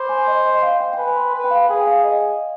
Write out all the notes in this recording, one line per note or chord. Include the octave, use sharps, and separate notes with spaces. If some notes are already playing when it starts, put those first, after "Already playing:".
Already playing: C5 B5 D6
G#5
D#5
D#5
F5
G5
G5
B4 G#5
C6
B4
G5
F5
G#4 G5
F5
D#5